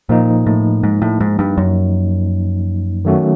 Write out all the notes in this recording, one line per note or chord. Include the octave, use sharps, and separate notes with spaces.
A#2 F3 A#3 D#4
A2
G#2
A2
G#2
G2
F#2
D#3 F#3 A3 C#4 F#4